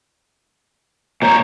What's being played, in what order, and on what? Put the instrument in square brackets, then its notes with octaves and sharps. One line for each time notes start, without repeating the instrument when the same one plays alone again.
[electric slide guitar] A#2 C5 C#5 [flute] A#5